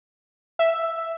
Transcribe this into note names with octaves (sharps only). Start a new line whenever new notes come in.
E5